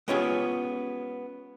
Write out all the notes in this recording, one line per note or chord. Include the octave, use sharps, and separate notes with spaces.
G#3 B3 C#4 F4 G4 G#4